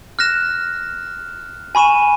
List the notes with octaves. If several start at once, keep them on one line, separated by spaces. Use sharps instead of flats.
F6 F#6 A#6 E7
G#5 B5 C#6 D#7 E7